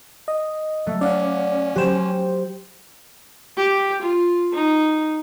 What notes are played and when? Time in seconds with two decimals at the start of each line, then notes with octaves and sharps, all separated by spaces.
0.28 D#5
0.86 F#3 A3
1.01 C#4 D5 F5 F#5
1.76 F#3 G4 C5 G5 E7
3.57 G4
4.01 F4
4.53 D#4